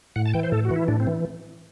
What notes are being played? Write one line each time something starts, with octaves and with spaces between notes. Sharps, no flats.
A2 F#5
A5
E3 G5
C5
A2 A4
F#4
E3
E4
A2 D4
C4
E3